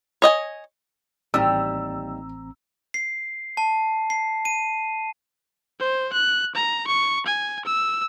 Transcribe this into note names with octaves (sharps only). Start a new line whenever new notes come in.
C#5 D#5 G5 G#5
A1 D#2 G3 C4 A#5 E6
C7
A5
C7
D#7
C5
F#6
A#5
C#6
G#5
E6